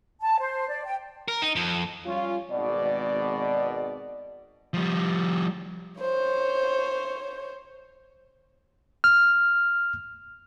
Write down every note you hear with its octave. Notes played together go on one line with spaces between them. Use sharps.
A5
C5
D5
G5
A#4
D#4
F2
G3 C#4 F4
G#1 B2 D5
F3 G3
C5 C#5
F6